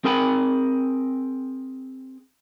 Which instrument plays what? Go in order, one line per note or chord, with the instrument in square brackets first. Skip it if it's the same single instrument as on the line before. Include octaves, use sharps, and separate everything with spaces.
[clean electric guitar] C4 G#4 A#4 G5 G#5 B5